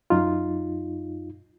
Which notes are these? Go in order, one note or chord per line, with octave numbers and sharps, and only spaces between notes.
F#2 D#4 F4